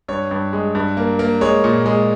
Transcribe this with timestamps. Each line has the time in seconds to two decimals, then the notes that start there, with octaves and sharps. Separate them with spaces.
0.08 G2 C#5
0.31 G2
0.53 G#3
0.75 G2
0.97 A#3
1.19 A#3
1.41 G#3 C#5
1.64 A#2
1.86 G#3